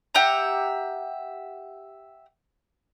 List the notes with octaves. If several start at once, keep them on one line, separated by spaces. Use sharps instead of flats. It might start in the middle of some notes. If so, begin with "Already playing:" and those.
G4 E5 F#5 A#5